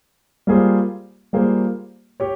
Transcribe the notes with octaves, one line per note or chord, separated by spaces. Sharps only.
G3 A#3 F4 G#4 C5
G3 A#3 F4 G#4 C5
G4 C#5